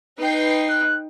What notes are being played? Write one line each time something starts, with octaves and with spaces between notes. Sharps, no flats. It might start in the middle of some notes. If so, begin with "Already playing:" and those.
D#4 B4 G5 C7
F#6